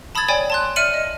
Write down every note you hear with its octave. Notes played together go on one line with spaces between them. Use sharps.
A5 B5 D#6 E6 G#6 A6
C#5 D5 G5 G#5 B5
A5 C6 F#6
D5 E5 F6 C#7 D#7 F#7
D#5